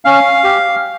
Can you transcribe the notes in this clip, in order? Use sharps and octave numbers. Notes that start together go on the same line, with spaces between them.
C#4 F5
G4